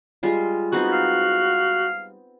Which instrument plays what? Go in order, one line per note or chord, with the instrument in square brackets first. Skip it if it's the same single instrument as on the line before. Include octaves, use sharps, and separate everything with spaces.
[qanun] G3 G#3 F4
[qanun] B3 C4 D#4 [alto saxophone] F#4
[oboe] F5